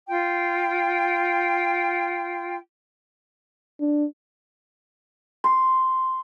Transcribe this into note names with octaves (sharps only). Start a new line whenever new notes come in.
F4 G5
D4
C6